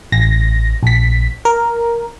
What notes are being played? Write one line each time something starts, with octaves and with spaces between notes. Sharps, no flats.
A1 A#6
A#1 B6
A#4